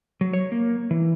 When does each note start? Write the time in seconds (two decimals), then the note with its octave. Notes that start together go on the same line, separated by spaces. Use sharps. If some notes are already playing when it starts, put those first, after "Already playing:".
0.21 F#3
0.33 C#5
0.52 A#3
0.91 E3